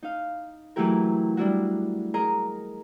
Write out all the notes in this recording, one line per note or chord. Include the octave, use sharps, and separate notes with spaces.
D#4 F5
E3 F#3 A3 E4 G4 A#4
G3 D4 E4 F#4
G#4 A#4 D#5 A#5